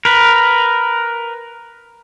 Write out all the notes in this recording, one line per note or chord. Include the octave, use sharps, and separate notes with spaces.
A#4 B4